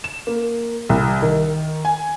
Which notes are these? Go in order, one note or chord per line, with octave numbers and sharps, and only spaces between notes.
E7
A#3
C2
D#3
G#5